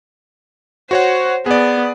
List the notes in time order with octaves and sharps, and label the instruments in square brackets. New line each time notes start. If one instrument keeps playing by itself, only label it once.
[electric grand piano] F#4 C#5 F#5 [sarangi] C5
[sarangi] B3 [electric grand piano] G#4 D5